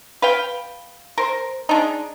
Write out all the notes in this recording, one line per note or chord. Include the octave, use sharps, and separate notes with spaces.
B4 F5 G5
A#4 C5
G#3 D4 D#4